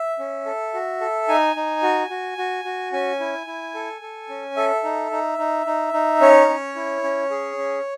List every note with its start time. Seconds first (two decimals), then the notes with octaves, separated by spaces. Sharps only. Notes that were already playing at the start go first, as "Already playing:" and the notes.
Already playing: E5
0.19 C#4
0.46 A4
0.74 F#4
1.01 A4
1.28 D#4 G#5
1.56 D#4
1.83 F#4
2.10 F#4
2.38 F#4
2.65 F#4
2.92 C#4 G#5
3.20 E4
3.47 E4
3.74 A4
4.02 A4
4.29 C#4
4.57 A4 E5
4.84 D#4
5.11 D#4
5.38 D#4
5.66 D#4
5.93 D#4
6.21 C#4 C#5
6.49 C#4
6.75 E4
7.04 C#4
7.30 G#4
7.58 C#4